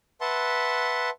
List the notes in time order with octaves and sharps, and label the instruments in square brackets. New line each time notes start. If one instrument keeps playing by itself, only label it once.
[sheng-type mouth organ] B4 E5 F#5 A5 C6